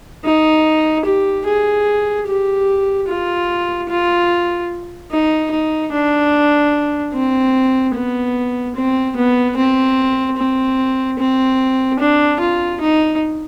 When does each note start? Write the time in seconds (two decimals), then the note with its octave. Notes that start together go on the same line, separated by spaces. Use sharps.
0.24 D#4
1.05 G4
1.46 G#4
2.27 G4
3.08 F4
3.89 F4
5.11 D#4
5.51 D#4
5.92 D4
7.13 C4
7.94 B3
8.76 C4
9.16 B3
9.56 C4
10.37 C4
11.19 C4
11.99 D4
12.40 F4
12.81 D#4